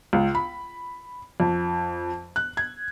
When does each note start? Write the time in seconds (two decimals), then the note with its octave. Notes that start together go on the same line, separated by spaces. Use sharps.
0.13 C#2
0.35 B5
1.40 F2
2.36 F#6
2.57 G#6